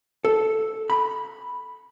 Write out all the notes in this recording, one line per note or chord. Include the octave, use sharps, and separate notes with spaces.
A4
B5